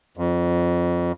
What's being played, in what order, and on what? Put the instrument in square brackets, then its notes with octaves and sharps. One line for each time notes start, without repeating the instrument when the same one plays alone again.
[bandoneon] F2